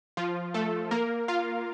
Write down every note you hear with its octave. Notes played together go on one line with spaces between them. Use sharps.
F3 F4
A3 A4
A#3 A#4
F4 F5